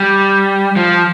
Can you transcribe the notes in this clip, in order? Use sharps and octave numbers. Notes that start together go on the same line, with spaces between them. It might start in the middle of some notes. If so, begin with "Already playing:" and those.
Already playing: G3
F3